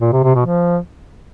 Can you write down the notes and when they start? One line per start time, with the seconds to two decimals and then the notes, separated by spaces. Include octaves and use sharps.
0.01 A#2
0.12 C3
0.23 C3
0.35 B2
0.46 F3